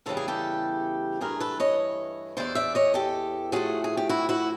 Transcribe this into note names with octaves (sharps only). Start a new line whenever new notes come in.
E2 C#3 E3 G3 A4
G#4
G4 A4
G2 E3 A3 G#4 A#4
A4 B4
C#5 D#5
E2 C3 E3 C5 D5
D5 E5
C#5 D#5
G4 A4
A2 F3 A3 F#4 G#4
G#4
G4
E4 F#4
E4 F#4